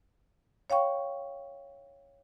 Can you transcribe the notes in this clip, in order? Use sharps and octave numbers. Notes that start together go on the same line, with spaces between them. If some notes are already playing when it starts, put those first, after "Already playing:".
C#5 F5 G5 C#6